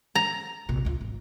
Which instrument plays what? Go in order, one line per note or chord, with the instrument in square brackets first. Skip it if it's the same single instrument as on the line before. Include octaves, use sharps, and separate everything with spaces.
[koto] A#5
[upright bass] A#1 C3
C#2 F4
G#1